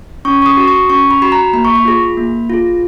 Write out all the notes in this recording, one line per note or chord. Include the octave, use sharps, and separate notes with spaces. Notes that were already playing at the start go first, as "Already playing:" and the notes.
C#4 C#6
C#6
D#6
F#4
C#6
C#4 C#6
B5
F#4 B5
A#5
A#3 B5
C#6
B5
F4 G#4
A#3
F4 G#4